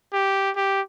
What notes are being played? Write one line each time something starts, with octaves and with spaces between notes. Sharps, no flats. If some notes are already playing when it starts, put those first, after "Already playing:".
G4
G4